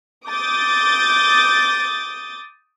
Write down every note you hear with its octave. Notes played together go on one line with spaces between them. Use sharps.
D6 D#6 G6 A6